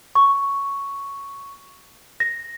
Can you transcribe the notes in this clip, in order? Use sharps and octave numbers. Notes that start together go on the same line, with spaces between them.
C#6
A#6